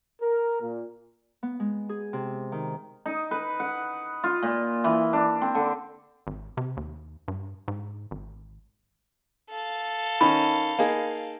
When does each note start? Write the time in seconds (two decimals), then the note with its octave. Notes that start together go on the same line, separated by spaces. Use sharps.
0.21 A#4
0.60 A#2
1.43 B3
1.60 G#3
1.89 G#4
2.13 C3
2.52 D#3
3.06 D#4
3.31 B4
3.60 F#5
4.24 F4
4.43 A#2
4.84 E3
5.13 D4
5.42 C4
5.55 D3
6.27 G#1
6.57 C3
6.77 D#2
7.28 G2
7.68 G#2
8.11 G#1
9.50 A4 F5
10.21 D#3 C#4 D#4 B5
10.79 A#3 D#4 G#4